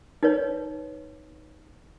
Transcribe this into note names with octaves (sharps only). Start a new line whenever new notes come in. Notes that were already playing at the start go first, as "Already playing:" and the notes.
D#4 B4 C#5